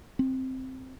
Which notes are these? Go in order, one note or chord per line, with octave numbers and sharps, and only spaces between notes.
C4